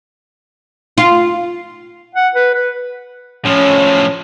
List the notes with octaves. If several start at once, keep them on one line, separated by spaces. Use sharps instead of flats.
F4
F#5
B4
B4
A2 F3 C#4